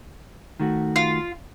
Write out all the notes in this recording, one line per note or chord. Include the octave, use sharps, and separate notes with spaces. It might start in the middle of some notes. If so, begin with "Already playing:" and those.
D#3 A3 F#4
F4